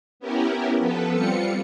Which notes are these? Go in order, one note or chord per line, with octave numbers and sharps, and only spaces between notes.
B3 C#4 E4 G4 A#4
F3 B3 A4 B4
G3 C4 F4 C#7